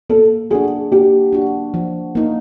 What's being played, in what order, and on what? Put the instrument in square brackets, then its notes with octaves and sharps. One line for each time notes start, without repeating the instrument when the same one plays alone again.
[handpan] A#3 [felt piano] A4
[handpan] D4 F#4 [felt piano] G#4
[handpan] A#3 [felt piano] G4
[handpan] D4 F#4
F3
A#3 D#4